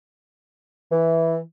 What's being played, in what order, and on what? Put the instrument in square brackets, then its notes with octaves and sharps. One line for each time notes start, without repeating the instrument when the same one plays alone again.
[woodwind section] E3